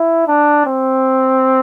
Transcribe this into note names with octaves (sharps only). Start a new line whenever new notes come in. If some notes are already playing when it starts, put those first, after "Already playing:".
Already playing: E4
D4
C4